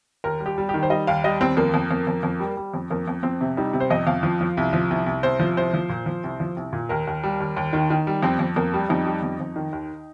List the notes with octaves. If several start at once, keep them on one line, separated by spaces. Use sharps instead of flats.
D#2 A#4
G3
G4
G3
D#3 G4
C5
G3 D#5
D#2 F5
G3 D#5
D#2 C4
F2 A#3
F2
F2
F2
F2
G3
G3
F2
F2 A#3
F2
F2 C4
C3
G3 D#4
C3
C5
F2 D#5
F2 F5
F3
F3
C2
F3
C2
C2
C2 C5
F3
C2 C5
F3
A#2
F3
C2
F3
C2
A#2
D#2 A#4
D#2
G3
D#2
D#2
D#3
D#3
G3
F2 C4
F2
F2 A#3
G3
F2 D#4
G3
F2
F2
D#3
D#2